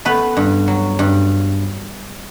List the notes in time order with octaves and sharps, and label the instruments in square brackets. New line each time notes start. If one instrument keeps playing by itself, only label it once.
[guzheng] A3 B3 B4
G2
F#3
G2